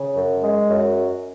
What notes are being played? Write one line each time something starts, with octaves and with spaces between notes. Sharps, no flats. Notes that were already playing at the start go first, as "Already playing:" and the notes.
Already playing: C#3
F#2
G#3
F#2